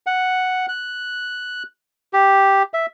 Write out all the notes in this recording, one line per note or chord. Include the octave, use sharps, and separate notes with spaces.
F#5
F#6
G4
E5